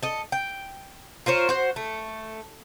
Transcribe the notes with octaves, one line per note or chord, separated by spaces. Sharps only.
A4 D#5
G5
F4 A#4 C5 C#5
F#4 C5
A3